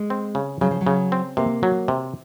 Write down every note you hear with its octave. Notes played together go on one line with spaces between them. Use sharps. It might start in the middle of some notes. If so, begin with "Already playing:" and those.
Already playing: G#3
C4
C#3
C#3 F#3
F3
F#3
C#3
C4
C3 A#3
F#3
C3